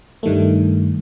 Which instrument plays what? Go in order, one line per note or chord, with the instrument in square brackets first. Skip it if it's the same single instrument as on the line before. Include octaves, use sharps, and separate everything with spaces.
[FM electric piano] G2 D#3 G3 A3